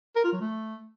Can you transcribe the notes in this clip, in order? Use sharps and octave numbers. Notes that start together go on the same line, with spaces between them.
A#4
F4
F#3
A3